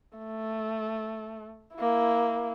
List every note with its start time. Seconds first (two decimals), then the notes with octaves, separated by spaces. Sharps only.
0.18 A3
1.75 A#3 E4